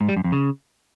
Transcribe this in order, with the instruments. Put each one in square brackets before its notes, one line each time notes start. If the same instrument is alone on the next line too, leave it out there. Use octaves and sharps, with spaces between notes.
[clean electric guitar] G#2
G3
F#2
F2
C#3